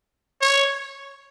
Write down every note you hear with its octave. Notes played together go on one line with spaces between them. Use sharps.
C#5